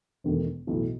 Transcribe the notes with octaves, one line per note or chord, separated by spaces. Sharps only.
E1 E2 D#3 A3
B1 A2 E3 A3 E4